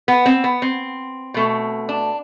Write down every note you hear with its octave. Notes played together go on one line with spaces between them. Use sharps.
B3
C4
B3
C4
B2 A3
D4